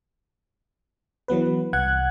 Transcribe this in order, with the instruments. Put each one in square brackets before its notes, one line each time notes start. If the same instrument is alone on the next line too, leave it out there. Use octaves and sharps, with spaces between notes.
[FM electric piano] E3 F#3 B3 B4
C2 F#5 F#6 G#6